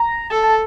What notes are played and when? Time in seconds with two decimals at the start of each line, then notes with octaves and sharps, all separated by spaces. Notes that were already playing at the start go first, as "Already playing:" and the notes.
Already playing: A#5
0.30 A4 A5
0.43 A5